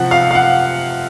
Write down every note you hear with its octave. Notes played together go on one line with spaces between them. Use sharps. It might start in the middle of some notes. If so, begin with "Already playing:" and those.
Already playing: C3 F3 C4 F#5
F5
F5
F#5